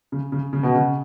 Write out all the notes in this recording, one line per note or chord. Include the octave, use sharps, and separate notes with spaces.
C#3
C#3
C#3
B2
C#3